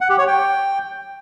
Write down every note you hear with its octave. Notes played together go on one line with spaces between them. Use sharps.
F#5
G4
C#5
G5